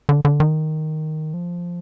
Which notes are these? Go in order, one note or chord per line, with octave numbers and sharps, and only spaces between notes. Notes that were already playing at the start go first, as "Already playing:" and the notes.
D3
D3
D#3
F3